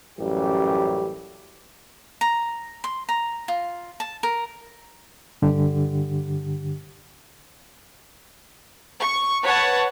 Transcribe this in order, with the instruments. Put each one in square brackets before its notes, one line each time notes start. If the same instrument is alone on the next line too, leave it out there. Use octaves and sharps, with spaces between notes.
[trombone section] A1 F#2 G3 G4
[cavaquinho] A#5
C6
A#5
F4
A5
A#4
[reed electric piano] G2 D3 G4
[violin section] C#6
B4 C#5 F#5 A5